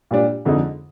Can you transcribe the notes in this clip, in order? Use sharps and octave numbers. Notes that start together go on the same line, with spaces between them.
A#2 G3 D4
F2 D3 G#3 D#4